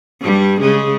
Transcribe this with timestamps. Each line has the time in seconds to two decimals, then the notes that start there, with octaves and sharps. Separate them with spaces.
0.21 G2 G3
0.60 C#3 G#3